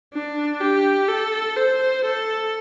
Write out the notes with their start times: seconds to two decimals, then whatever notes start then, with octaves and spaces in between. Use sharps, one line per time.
0.14 D4
0.61 G4
1.09 A4
1.57 C5
2.05 A4